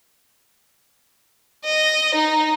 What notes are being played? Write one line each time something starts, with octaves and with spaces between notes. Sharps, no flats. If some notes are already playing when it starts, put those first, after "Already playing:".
D#5
D#4